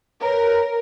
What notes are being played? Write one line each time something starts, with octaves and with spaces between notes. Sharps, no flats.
A#4 B4 C#5